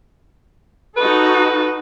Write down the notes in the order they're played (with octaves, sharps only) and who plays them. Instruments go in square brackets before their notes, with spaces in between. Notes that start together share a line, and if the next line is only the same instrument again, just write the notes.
[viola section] D#4 F#4 A4 [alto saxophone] B4